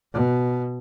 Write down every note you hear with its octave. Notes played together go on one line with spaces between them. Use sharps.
B2